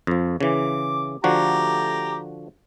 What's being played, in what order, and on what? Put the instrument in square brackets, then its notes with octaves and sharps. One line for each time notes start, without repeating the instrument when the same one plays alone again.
[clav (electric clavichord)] F2 F3
[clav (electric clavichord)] C#3 E3 [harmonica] D6
[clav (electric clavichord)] D3 F3 F#4 [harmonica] A3 G4 A#5